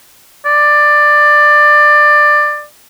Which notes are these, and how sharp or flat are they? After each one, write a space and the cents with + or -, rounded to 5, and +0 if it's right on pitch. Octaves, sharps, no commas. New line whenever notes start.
D5 +15